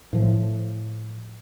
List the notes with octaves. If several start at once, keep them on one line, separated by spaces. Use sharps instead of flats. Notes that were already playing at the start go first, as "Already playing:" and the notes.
A2 F3